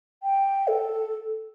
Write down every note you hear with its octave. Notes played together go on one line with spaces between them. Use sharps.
G5
A4